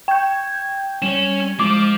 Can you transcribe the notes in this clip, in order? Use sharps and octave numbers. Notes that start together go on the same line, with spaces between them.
G5 G6 G#6
G3 C#4 E7
F3 G#3 D6